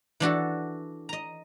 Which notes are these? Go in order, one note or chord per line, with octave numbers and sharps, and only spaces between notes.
E3 D4 F#4 A4
D#5 A#5